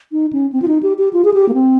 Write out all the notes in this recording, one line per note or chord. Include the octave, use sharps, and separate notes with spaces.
D#4
C#4
C4
F4
D#4
G4
G4
F4
G#4
G4
A#3
C4